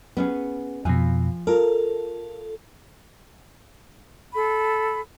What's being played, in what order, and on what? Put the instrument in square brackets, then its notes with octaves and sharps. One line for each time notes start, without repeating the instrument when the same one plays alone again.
[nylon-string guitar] B3 C#4 G#4
[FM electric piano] F2 B2 [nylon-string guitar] F3 G#5
[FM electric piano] F4 A4 [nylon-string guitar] A#4
[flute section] A4 B5